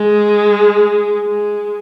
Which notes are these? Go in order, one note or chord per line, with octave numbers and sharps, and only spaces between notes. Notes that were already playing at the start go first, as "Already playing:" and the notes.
Already playing: G#3
G#3